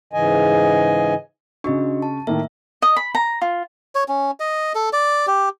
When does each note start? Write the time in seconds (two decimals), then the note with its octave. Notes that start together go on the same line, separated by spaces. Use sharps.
0.13 G#2 C#3 E3 D#5 G#5
1.64 C#3 D4 F#4 D#5 C#6
2.02 A5
2.27 A2 D#3 A#3 E5
2.82 D#5
2.96 B5
3.15 A#5
3.42 F4
3.95 C#5
4.08 C#4
4.40 D#5
4.75 A4
4.93 D5
5.27 G4